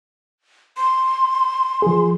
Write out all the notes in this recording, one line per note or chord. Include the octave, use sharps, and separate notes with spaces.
C6
F3 G#4